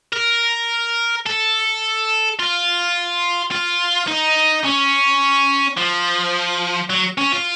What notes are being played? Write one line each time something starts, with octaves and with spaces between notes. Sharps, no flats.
A#4
A4
F4
F4
D#4
C#4
F3
F#3
C#4
F4